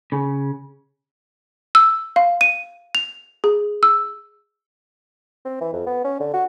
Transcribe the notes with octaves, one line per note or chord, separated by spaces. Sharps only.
C#3
E6
F5
D#7
F7
G#4
E6
C4
E3
F2
B3
C#4
D3
F#4